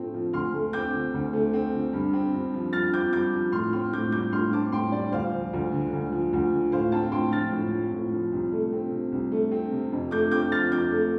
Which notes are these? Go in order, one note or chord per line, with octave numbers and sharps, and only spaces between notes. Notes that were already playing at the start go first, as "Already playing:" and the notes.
Already playing: A2 F3 A3 C4
F3
D2 C6 F6
A3
C4 D6 G6
D3
D2
A3
C4
D3
G2
C4
G2
F3
G2 F6 A6
C4 D6 G6
G2 D6 G6
F3
A2 C6 F6
C4 C6 F6
A2 D6 G6
G3 D6 G6
A2 C6 F6
C4 A5 D6
A2 G5 C6
G3 D5
D2 C5 F5
F3
D2
D3
D2
F3
D2
D3
A2 C5 F5
C4 F5 A5
A2 G5 C6
F3 F6 A6
A2
C4
A2
F3
C2
A3
C4
C3
C2
A3
C4
C3
F2
A3 D6 G6
C4 D6 G6
F3 F6 A6
F2 D6 G6
A3